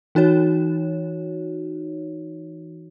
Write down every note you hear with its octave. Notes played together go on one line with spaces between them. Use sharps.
E3 D#4 F#4 C#5